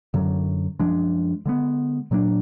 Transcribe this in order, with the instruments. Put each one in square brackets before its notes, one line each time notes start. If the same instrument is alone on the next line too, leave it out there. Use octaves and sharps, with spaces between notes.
[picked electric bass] F#2 D3 F#3
F#2 F3 G#3 D4
D3 G#3 B3
A#2 F#3 A#3 D4